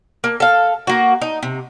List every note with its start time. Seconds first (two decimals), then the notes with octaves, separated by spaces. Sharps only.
0.24 A#3
0.40 A4 F5
0.87 A#3 F#4
1.22 D#4
1.43 C3